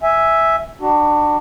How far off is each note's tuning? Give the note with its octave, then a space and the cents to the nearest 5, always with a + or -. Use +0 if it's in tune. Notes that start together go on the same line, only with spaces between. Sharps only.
E5 +0 G#5 +0
D4 +25 F#4 +30